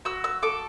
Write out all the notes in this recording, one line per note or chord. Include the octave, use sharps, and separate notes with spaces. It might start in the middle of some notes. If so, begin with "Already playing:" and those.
F#4 E6
E6
A4 D6